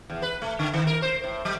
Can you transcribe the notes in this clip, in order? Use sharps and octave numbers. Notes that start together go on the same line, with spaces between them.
E2
B4
A3
D3
D#3
A#4
C5
A2
F#3